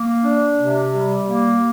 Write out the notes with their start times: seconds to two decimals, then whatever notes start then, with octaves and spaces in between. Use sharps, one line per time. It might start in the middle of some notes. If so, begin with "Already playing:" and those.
Already playing: A#3
0.23 D4
0.58 C3
0.93 G3
1.27 A#3